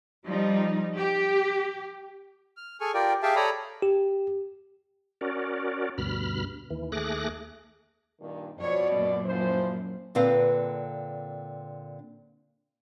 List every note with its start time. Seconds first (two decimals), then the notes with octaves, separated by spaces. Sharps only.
0.26 F3 G3 D#4
0.96 G4
2.57 F6
2.81 G#4 A4 G#5 C#6 F6
2.94 F4 G4 A#4 D5 G5
3.23 G4 G#4 E5 F5 G5 A5
3.36 A4 C#5 D5 A#5 B5 D#6
3.82 G4
5.21 C#4 F#4 A#4 D5
5.98 D2 G2 B2 B5 F6
6.70 D#2 E3
6.92 D#2 A3 G#4 D6 F#6 A#6
8.21 G2 A#2 D#3
8.59 F2 B2 C#5 D5
8.94 F#2 A#2
9.26 E3 F3 C5
10.15 A#2 D3 C4 B4 F5